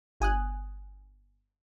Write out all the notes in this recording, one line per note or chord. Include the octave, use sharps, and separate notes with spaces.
G1 G#5 D#6 F#6